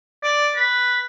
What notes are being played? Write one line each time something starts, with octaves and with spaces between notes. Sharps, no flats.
D5
B4